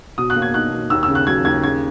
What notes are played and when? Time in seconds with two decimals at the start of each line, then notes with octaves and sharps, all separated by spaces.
0.18 B2 D#6
0.30 F#6
0.36 A#3
0.42 G#6
0.54 D#4 F#6
0.72 B2
0.90 D#2 E6
1.03 E6
1.09 C#3
1.15 F#6
1.27 F#3 G#6
1.45 D#2 G#6
1.63 C#3 G#6